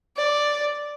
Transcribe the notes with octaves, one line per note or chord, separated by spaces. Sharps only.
D5